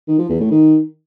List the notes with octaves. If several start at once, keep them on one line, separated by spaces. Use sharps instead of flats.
D#3
F3
E2
A2
D#3